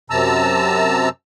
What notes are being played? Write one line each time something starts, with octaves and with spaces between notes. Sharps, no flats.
F#2 C3 A5 A#5 E6